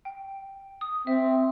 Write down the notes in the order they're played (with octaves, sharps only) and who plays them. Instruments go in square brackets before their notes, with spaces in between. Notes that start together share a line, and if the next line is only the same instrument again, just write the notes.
[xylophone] G5
D#6
[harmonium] C4 [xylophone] E5